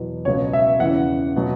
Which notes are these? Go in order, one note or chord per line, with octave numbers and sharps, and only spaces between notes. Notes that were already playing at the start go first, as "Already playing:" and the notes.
Already playing: E2 B2 F#3
C#2 B2 F#3 C#5
E5
E2 C#3 E3 F#5
B2 F#3